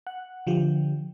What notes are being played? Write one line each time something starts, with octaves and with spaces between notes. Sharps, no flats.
F#5
D3 F3 G4